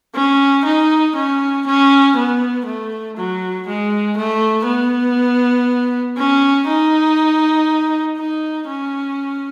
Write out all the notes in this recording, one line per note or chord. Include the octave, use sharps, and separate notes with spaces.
C#4
D#4
C#4
C#4
B3
A3
F#3
G#3
A3
B3
C#4
D#4
D#4
C#4